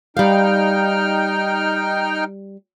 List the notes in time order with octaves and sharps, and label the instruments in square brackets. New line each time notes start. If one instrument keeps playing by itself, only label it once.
[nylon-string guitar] G3 F5 [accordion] D#4 G5 F6